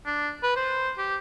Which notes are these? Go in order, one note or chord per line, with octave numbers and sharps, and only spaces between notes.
D4
B4
C5
G4